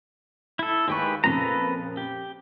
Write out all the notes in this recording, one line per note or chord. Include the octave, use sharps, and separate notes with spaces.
E4 A4
D#2 G#3 G4 B4 C#6
F2 A#2 C#3 A4 B4 A#5
G4